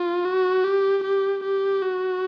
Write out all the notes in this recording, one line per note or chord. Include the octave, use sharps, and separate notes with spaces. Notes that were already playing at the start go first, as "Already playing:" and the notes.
Already playing: F4
F#4
G4
G4
G4
F#4